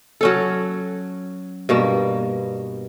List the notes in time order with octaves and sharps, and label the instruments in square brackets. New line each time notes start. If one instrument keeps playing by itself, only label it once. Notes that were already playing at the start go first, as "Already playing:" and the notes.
[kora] F#3 C#4 A4
G2 B2 A#3